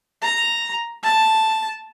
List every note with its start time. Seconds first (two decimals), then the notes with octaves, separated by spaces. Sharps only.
0.22 A#5
1.03 A5